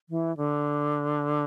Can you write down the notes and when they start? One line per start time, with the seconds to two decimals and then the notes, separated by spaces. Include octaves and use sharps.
0.09 E3
0.37 D3